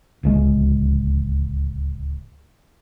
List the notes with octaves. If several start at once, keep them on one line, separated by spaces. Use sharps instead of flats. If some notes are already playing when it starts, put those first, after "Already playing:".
D1 C#2 G#3